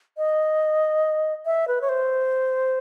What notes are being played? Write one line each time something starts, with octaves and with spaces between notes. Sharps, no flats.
D#5
E5
B4
C#5
C5